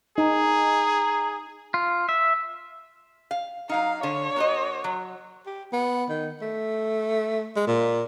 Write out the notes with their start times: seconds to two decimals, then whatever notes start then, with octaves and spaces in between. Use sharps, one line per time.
0.18 D#4 G#4 A#5
1.74 F4
2.09 E5
3.31 F5
3.69 F#3 D#4 F5
4.03 D3 C#5
4.36 A#3 F#4 D#5
4.84 F#3
5.46 G4
5.73 B3
6.09 D#3
6.42 A3
7.56 G#3
7.67 A#2